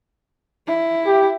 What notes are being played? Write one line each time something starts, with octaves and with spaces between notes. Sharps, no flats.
E4
G4